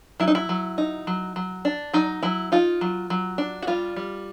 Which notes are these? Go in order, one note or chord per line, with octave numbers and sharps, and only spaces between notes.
F#3 E4
D#4
E4
F#3
D#4
F#3
F#3
D4
F#3 D#4
F#3 E4
D#4 F4
F#3
F#3
D4
F#4
G3 F4
G3